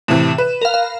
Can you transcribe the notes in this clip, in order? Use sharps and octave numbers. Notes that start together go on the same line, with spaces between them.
A2 C3 E3 E7
B4
A#4 F5
F5